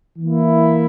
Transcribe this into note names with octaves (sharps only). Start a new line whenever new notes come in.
E3 A#3 E4